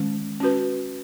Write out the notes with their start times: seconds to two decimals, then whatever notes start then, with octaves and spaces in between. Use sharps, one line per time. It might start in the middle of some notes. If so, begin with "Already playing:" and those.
Already playing: D#3 G#3 C#4
0.40 C#4 F#4 B4